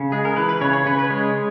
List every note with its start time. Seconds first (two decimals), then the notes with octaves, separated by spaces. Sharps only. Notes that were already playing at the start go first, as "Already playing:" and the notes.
Already playing: C#3
0.12 G#3 G#4
0.25 A#4
0.36 E3 B4
0.49 B4
0.61 C#3 C#5
0.73 C#5
0.86 C#3 B4
0.99 B4
1.10 G#3 C#5